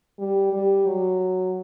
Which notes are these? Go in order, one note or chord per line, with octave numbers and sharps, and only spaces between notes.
G3
G3
F#3